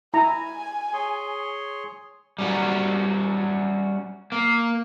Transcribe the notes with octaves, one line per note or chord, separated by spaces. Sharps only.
E4 G#5 A#5
G#4 C#5 C6
G3 C#4 F#4
A#3